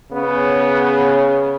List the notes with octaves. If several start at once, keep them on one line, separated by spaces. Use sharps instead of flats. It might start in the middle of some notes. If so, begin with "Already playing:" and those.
C#3 B3